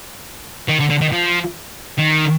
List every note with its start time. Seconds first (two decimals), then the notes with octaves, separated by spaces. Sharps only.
0.69 D#3
0.80 D3
0.90 D3
1.01 D#3
1.12 F3
1.99 D#3